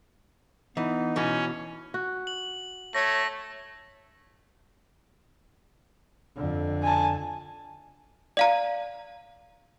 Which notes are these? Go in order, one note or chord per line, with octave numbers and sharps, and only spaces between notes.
E3 B3 D#4
B2 E3 C#4
F#4
F#7
A3 C#5 A#6
F2 D3
G#5 A5
D5 F5 A#5